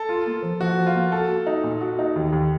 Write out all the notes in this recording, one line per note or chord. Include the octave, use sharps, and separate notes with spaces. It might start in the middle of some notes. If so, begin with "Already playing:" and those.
Already playing: A4
F4
A#3
F3
F3 F#4
F3
F4
A#3
F#4 A4
F#4
D#4
A#2
F#4
D#4
D#2
D#2